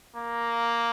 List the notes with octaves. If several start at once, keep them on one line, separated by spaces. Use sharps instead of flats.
A#3